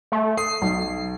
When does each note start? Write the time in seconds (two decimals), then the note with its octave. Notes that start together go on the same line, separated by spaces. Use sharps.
0.12 A3
0.37 D#6 C7
0.62 B1